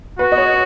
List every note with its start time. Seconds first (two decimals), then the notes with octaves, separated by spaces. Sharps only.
0.19 F#4 B4
0.32 D#5
0.38 C#5